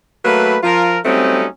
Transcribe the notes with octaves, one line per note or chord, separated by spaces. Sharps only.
F#3 A3 A#3 B4
F3 F4 A#4
F#3 G3 A3 C4 C#4 D#4